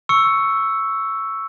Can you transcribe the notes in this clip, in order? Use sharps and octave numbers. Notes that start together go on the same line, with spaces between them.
C#6 E6 C#7